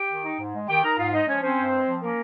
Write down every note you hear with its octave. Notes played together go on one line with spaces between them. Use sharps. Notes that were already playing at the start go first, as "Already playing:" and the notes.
Already playing: G4 G5
D#3
D#4
G#2
G#3
D#3 G4 G5
D#4 A#4 A#5
G#2 F4 F5
G#3 D#4 D#5
F3 C#4 C#5
C4 C#4 C5
G2
G#3
F3
A#3 C#4 A#4